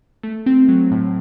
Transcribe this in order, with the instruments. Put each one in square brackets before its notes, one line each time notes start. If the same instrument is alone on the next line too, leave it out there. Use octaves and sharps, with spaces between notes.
[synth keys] A3
C4
F#3
A2